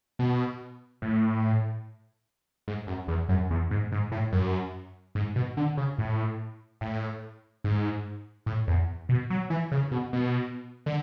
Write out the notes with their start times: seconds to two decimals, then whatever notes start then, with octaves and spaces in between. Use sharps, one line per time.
0.19 B2
1.02 A2
2.68 G#2
2.87 F#2
3.08 E2
3.29 F#2
3.50 E2
3.71 G#2
3.92 G#2
4.12 A2
4.33 F#2
5.15 G#2
5.36 B2
5.57 D3
5.77 C#3
5.98 A2
6.81 A2
7.64 G#2
8.46 A2
8.68 E2
9.09 B2
9.30 F#3
9.50 E3
9.72 C#3
9.91 B2
10.13 B2
10.86 D3